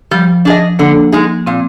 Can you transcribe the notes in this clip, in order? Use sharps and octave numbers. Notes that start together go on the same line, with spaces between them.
F3 G3
D4 G#4 D#5
D3 A#3
G#3 D#4 G#4
A#2 C4